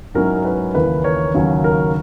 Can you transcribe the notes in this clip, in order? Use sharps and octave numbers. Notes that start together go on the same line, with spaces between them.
G#2 F#3 C#4 E4 A#4
B4
D#2 C#3 E3 A#3 B4
A#4 C#5
D#2 C#3 F#3 C#4
A#4